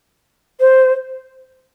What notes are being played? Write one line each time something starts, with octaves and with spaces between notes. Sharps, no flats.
C5